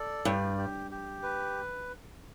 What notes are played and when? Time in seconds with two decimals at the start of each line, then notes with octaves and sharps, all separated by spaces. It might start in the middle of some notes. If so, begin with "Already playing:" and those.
Already playing: A4 D5
0.25 G2 G4
0.58 G4
0.91 G4
1.23 B4